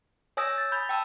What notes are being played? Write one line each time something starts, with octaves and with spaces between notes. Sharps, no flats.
C#5 G#5 D#6 E6 A#6
A6
B5 G6
G5 A5 E6